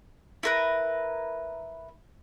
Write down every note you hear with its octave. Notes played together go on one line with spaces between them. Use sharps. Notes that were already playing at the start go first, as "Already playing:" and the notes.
E4 A#4 B4